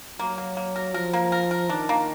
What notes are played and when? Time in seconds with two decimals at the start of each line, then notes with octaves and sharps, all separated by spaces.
0.19 F#3 A#3
0.38 A#3
0.57 A#3
0.76 A#4
0.94 F3 A#4
1.13 A#3
1.32 A#4
1.51 A#4
1.70 D#3 D4
1.89 A#3